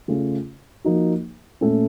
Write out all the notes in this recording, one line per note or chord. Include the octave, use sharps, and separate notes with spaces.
C#3 A3 C#4 F4
F3 A#3 D#4 F#4
A#2 A3 C#4